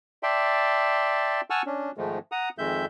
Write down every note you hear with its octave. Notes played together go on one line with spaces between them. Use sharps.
D5 E5 G5 A5 C6
F#5 G#5 A5 C#6 E6 F6
C#4 D4
G#2 D#3 F3 G#3 A3
F#5 A#5 D#6
F2 D#3 G#3 E5 G6